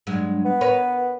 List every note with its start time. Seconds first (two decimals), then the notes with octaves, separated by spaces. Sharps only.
0.07 G2 F#3 G#3
0.45 B3
0.61 A#4 B4 C#5